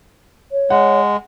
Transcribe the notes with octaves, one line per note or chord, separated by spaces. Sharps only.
C#5
G#3 F#5